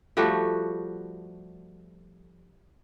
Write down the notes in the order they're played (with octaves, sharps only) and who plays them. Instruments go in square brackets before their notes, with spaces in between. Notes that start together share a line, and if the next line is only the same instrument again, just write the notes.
[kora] F3 G3 A3 F#4